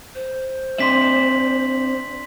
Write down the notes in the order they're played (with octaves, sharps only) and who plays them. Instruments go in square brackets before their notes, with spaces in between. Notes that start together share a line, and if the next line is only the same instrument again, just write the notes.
[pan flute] C5
[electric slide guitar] C4 D4 E5 [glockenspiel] C6 B6 F#7